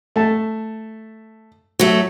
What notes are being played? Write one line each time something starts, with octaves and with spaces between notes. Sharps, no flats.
A3 A5
F#3 A3 F#4